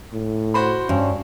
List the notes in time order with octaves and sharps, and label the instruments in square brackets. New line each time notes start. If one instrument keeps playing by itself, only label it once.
[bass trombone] A2
[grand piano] F#4 C5 B5
[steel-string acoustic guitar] G2 [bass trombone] C#4